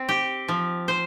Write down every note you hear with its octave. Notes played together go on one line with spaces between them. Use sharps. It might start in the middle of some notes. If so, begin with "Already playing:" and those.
Already playing: C4
G4
F3
C5